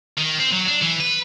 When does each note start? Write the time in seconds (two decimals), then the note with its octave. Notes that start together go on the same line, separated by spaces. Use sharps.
0.17 D#3
0.39 C4
0.52 F#3
0.67 D4
0.82 E3
1.01 B4